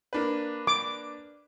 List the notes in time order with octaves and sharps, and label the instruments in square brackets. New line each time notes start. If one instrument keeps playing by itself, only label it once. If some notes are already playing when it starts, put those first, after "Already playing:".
[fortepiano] A#3 D4 B4
[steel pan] D6